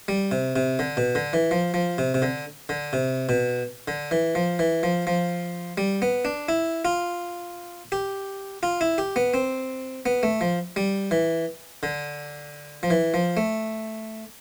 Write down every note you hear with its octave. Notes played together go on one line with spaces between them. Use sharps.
G3
C3
C3
D3
B2
D3
E3
F3
F3
C3
C3
D3
D3
C3
B2
D3
E3
F3
E3
F3
F3
G3
B3
D4
E4
F4
G4
F4
E4
G4
B3
C4
B3
A3
F3
G3
E3
D3
F3
E3
F3
A3